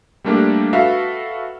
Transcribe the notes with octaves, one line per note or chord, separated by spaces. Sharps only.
G3 A3 A#3 D4 G4 A4
F#4 A4 B4 E5 F5